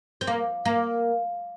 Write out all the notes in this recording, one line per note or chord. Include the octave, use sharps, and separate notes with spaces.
C4
A#3
A#3